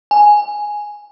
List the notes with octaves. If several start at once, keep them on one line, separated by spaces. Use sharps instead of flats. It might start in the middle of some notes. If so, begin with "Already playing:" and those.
G#5